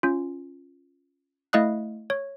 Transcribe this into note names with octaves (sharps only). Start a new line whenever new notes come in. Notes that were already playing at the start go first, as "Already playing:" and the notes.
C#4 F4
A3 E4 D#5 F5 D#6 F#6
C#5